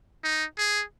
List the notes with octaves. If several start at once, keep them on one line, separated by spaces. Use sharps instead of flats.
D#4
G#4